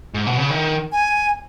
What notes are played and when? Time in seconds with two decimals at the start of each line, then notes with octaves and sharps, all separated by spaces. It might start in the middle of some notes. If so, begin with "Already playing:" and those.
0.14 G#2
0.27 B2
0.38 C#3
0.50 D#3
0.92 G#5